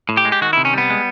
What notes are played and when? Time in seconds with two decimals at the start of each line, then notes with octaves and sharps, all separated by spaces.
0.09 A2
0.17 G4
0.25 G#3
0.32 G4
0.41 D#3 F#4
0.53 E4
0.57 C3
0.65 C#4
0.73 G3 B3
0.90 G#3